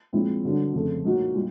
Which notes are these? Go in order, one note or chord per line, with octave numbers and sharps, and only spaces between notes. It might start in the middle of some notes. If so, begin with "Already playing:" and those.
A#2 F3 G#3 C4 E4
G2 D3 F#3
F2 C#3 F3 A3
A#2 F#3 A#3 D#4 F#4
A#2 G3